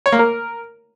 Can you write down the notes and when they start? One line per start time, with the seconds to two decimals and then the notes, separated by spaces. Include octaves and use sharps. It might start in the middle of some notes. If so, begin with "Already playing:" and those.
0.06 C#5
0.12 A#3
0.19 A#4